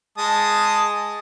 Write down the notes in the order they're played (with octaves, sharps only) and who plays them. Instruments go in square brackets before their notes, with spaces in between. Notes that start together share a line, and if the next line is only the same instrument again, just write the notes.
[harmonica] G#3 A5 D#6